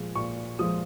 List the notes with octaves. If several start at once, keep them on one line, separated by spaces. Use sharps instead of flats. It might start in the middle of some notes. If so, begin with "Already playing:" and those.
Already playing: A#2 F3 G#3
A#2 C#6
F3 G#3 D#6